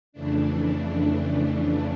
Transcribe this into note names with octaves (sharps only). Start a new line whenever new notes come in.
F2 C#3 E3 A3 D4